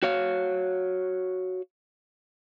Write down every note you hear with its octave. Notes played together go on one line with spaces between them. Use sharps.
F#4 C#5 F5